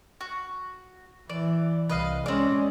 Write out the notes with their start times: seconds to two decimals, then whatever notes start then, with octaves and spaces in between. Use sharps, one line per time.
0.21 F#4
1.30 E3 D5
1.89 C2 B4 D#5 F5
2.26 G#3 C4 C#4 D5